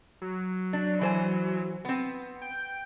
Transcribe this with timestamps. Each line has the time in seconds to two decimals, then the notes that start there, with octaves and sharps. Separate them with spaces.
0.22 F#3
0.73 D4
1.01 E3 C5 G#5
1.85 B3 C4
2.42 G5